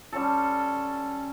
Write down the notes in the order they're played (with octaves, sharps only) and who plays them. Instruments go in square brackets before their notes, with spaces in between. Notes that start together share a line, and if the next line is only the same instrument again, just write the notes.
[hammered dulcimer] G3 C#4 F4 A4